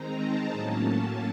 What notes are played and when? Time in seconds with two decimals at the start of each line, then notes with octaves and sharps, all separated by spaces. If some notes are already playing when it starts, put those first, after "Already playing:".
Already playing: D#3 G#3 C4 D#4 A#5
0.19 A5
0.52 A2 F#3 A#3 C#4